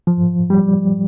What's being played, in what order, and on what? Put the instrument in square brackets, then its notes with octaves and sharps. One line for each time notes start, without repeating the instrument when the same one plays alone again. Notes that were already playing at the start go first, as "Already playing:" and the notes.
[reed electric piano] F3
G3